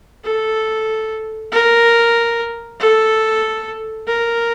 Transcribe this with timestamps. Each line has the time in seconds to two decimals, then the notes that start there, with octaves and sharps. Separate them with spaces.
0.24 A4
1.52 A#4
2.80 A4
4.07 A#4